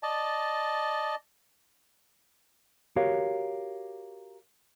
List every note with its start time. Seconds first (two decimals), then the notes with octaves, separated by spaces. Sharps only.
0.03 D5 D#5 A5
2.96 F#4 G4 A#4 C#5 F5